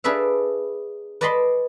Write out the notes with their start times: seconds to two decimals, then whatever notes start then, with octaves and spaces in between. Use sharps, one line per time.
0.04 D4 G#4 B4 D5 E5 F5
1.21 B4 D5 D#5 A5 B5 C6